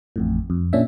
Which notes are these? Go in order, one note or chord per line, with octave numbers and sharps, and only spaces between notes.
A1 F2 A2
F2
A#2 C#4 D4 E5